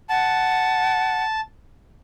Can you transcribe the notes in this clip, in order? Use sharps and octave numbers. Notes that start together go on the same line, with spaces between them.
F#5 A5